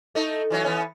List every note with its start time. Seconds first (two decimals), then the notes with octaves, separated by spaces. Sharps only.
0.15 A3 D#4
0.50 E3 F#3 C#4
0.65 E3 B3 C#4